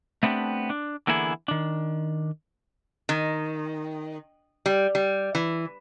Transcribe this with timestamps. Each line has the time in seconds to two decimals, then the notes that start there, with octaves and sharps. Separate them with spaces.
0.23 A3 B3 C4 D4 G4
0.70 D4
1.07 D3 E3 A#3 B3 E4 G#4
1.48 D#3 D4
3.09 D#3
4.66 G3
4.95 G3
5.35 E3